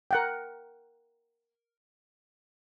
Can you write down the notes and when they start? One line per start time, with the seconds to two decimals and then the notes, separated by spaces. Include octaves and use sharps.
0.11 A#4 F#5 G5